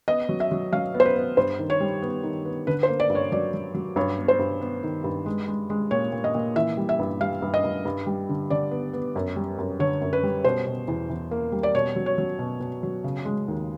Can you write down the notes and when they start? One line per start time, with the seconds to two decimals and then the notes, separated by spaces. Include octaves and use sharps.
0.08 B3 D#5
0.29 F#3
0.40 E5
0.52 F#3
0.73 F#3 F5
0.94 B3
1.00 C5
1.06 B4
1.16 B3
1.37 G2 C5
1.59 D#3
1.70 C#5
1.80 G3
2.02 B3
2.23 D#3
2.45 B3
2.67 D3 B4
2.83 C5
2.88 A#3
3.00 D5
3.10 G2
3.15 C#5
3.32 F#3 D5
3.54 F#3
3.74 F#3
3.96 G2 C#5
4.18 B3
4.28 C5
4.39 G2
4.61 B3
4.83 D#3
5.04 G2
5.26 G#3
5.48 G#3
5.70 G#3
5.91 A#2 C#5
6.12 A#2
6.24 D#5
6.35 A#2
6.56 E3 E5
6.77 G3
6.89 E5
6.99 G2
7.21 G3 F5
7.42 G2
7.54 D#5
7.64 G2
7.85 G2
8.07 G3
8.29 D3
8.50 D3 D5
8.71 B3
8.93 B3
9.16 F#2
9.36 G3
9.58 F#2
9.79 D3 C#5
10.01 F#2
10.13 B4
10.23 G3
10.45 B2 C5
10.67 B2
10.88 E2
11.09 E2
11.31 A#3
11.52 G3
11.63 D5
11.75 B2 C#5
11.96 F#3
12.06 C#5
12.18 F#3
12.39 B2
12.60 B2
12.83 F#3
13.04 C#3
13.25 G#3
13.48 D#2